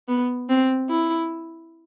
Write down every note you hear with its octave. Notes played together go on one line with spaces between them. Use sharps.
B3
C4
E4